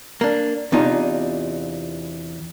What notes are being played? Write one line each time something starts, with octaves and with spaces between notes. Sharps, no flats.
A#3 D4
E2 C3 D4 D#4 F4